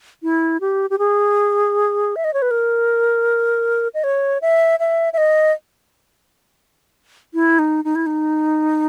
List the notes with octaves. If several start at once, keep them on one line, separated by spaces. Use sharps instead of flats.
E4
G4
G4
G#4
E5
D#5
C#5
B4
A#4
D#5
C#5
E5
E5
E5
D#5
E4
D#4
D#4
E4
D#4